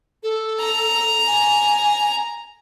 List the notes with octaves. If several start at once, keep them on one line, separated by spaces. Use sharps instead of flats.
A4
A#5
G#5